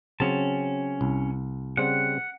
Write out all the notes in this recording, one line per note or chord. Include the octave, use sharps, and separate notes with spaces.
C#3 F#3 C4 C#4 A5
C2
C#3 G3 C4 F#5